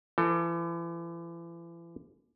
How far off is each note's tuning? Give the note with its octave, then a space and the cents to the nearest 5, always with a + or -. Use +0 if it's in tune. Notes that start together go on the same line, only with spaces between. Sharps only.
E3 +40 A4 +30